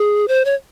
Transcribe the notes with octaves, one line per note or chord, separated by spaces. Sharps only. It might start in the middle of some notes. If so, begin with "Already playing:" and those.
Already playing: G#4
C5
C#5